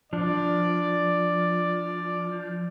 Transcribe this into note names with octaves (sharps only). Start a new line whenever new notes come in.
F3 D4 D5